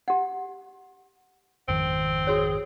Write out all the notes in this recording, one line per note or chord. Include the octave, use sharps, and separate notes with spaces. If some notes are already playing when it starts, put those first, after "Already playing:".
G4 F#5
G#1 F2 D#3 C4
F#4 G#4 C#5